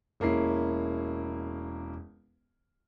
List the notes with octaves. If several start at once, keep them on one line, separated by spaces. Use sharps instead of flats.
E1 A#3 C#4 E4 C7